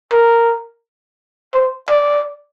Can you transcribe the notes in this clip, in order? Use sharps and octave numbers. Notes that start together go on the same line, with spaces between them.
A#4
C5
D5